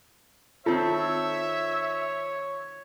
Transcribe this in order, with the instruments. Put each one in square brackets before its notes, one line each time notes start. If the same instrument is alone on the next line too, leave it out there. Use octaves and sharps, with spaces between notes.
[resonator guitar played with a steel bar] D#3 C4 A4 [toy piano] F4 [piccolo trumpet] C#5 [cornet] E5